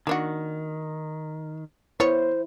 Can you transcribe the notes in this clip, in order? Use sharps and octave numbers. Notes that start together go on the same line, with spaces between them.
D#3 A#3 D4 F#4
B3 E4 C5 C#5